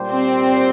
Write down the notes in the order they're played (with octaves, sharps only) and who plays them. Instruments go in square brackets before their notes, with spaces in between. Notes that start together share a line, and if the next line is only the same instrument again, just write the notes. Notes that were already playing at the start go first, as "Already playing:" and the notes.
Already playing: [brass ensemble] A#2 G3 D4 G4 C5
[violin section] C4